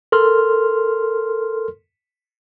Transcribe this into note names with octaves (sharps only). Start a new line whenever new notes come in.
A4 A#4 C6 F6